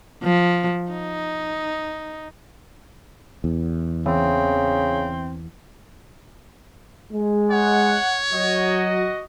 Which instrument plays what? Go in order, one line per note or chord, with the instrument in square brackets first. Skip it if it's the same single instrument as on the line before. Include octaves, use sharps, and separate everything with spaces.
[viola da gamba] F3
D#4
[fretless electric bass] E2
[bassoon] C#3 [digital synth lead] E3 [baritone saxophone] C4
[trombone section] G#3
[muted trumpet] C#5 [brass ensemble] F#5
[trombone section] F#3 [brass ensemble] F#4 D#5